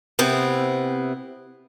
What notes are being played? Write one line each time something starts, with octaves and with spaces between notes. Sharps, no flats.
C3 B3 C4 E4